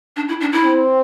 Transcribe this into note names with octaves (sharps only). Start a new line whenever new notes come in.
D4
E4
D4
E4
C4